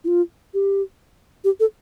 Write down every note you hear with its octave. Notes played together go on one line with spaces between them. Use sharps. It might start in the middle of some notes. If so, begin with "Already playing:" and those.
E4
F4
G4
G4
A4